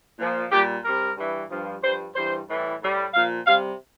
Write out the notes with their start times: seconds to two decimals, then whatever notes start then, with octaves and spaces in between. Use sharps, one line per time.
0.19 A#2 F3
0.52 A#2 G3 G4
0.84 C3 G3 A#4
1.17 G2 E3 G3
1.50 G2 F3
1.83 G2 F3 C5
2.15 G2 E3 G3 C5
2.49 A2 E3 G3
2.81 A2 G3
3.14 A#2 F3 F5
3.46 C3 G3 F5